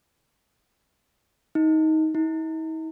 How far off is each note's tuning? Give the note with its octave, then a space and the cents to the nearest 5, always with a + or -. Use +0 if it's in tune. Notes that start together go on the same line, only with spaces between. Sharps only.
D#4 +20
D#4 +45